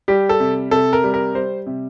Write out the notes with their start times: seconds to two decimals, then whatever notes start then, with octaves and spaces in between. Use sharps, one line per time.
0.08 G3 G4
0.29 A4
0.40 C3
0.71 C3 A4
0.93 A#4
1.04 G3
1.14 A#4
1.35 G3 C5
1.66 C3